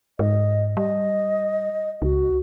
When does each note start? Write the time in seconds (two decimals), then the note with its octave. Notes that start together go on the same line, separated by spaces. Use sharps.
0.19 G#2 D#5
0.77 G3 D#5
2.02 C#2 F#4